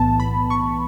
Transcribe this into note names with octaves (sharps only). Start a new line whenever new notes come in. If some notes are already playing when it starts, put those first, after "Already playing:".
Already playing: B1 A2 E3 B3 A5
B5
C#6